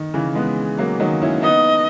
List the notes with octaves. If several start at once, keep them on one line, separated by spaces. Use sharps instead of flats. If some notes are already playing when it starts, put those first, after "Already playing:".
Already playing: D#3
C#3 E3
G#3 B3
F#3 A#3
D#3 F#3
C#4 E4
B3 D#4 D#5